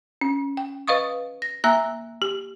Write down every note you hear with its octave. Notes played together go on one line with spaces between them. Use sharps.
C#4
G5
B4 D#5 F5 C#6 D#6
A#6
A#3 E5 A#5 E6 F#6
G4